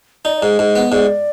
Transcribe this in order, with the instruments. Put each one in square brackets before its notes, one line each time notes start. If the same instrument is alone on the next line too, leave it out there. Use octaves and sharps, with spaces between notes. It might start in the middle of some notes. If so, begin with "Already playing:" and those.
[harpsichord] D#4 [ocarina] D5
[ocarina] D5
[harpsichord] G#2 [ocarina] D#5
[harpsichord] G#2
B3
[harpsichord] G#2 [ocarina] D5